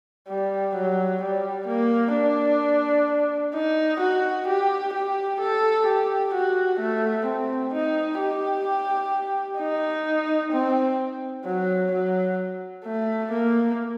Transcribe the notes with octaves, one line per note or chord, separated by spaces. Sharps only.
G3
F#3
G3
A#3
D4
D#4
F#4
G4
G4
A4
G4
F#4
A3
C4
D#4
G4
D#4
C4
F#3
F#3
A3
A#3